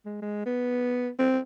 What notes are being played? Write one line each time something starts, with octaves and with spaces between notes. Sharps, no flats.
G#3
G#3
B3
C4